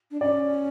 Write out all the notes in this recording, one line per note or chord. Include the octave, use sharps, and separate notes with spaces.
D4
C#4 D5